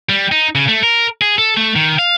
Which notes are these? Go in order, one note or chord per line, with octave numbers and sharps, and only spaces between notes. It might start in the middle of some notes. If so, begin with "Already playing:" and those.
G3
D#4
C#3
A3
A#4
G#4
A4
A3
D#3
F5